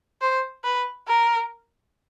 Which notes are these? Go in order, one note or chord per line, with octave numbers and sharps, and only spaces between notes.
C5
B4
A#4